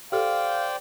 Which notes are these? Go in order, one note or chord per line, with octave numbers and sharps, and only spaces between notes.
G4 A4 C5 D5 F5 G5